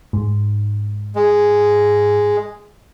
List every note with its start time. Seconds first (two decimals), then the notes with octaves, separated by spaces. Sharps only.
0.13 G#2
1.15 G#3